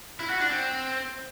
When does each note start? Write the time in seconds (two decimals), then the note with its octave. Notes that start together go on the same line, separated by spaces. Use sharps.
0.19 E4
0.30 F#4
0.40 D4
0.50 C4